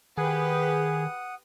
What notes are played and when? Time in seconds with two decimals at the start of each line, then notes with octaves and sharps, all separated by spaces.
0.17 D#3 G4 G#4 B4 F#5 D#6